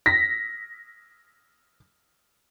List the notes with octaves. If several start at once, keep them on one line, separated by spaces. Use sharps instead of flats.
A#6 B6